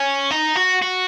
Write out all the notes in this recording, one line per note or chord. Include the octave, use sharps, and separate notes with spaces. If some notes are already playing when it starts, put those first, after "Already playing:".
Already playing: C#4
D#4
F#4
F#4